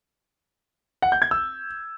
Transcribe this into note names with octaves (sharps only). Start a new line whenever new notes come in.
F#5
G6
G#6
E6